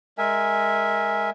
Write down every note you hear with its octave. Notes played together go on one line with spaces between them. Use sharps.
G#3 A#4 E5 G#5